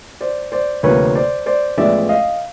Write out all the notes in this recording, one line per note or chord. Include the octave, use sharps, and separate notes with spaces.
C5 D5
C5 D5
D2 C3 F3 A#3 B4 C#5
C5 D5
C5 D5
A1 A2 F3 G#3 B3 D5 E5
D#5 F5